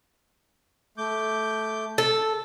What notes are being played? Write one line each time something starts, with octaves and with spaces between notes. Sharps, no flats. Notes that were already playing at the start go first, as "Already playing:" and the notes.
A3 D6 G6
A4